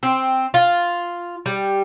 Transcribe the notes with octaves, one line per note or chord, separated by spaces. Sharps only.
C4
F4
G3